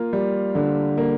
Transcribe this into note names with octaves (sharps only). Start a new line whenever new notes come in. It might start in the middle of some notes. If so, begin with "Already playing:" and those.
Already playing: A#3 F4
G3
D3
A#3